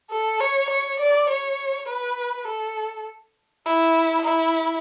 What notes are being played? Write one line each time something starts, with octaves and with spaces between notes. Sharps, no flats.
A4
C#5
C#5
D5
C#5
B4
A4
E4
E4